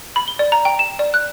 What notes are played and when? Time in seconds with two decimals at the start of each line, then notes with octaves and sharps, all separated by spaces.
0.16 B5
0.28 G7
0.39 D5
0.52 A#5
0.65 G5
0.79 E7
0.99 D5
1.14 F#6